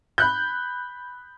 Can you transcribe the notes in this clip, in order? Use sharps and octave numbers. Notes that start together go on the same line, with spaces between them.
B5 F#6 G6